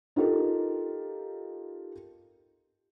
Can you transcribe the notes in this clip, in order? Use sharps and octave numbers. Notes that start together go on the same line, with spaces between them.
D#4 F4 G4 A4 A#4